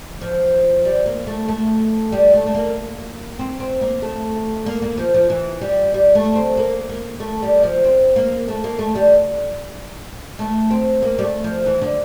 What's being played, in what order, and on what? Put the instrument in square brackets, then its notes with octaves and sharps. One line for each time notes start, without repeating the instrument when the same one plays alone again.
[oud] F3
G3
A#3
A3
A3
G3
A3
A3
A#3
C4
C4
A#3
A3
A#3
A#3
F3
F3
E3
G3
G3
A3
C4
A#3
A#3
A3
G3
F3
C4
A#3
A3
A#3
A3
G3
A3
C4
A#3
G3
A3
F3
E3
D3